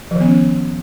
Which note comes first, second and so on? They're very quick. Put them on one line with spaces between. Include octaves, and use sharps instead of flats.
F3 D#3 B3 C#4